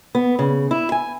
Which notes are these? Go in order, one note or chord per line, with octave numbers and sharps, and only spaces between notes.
B3
C#3
E4
G#5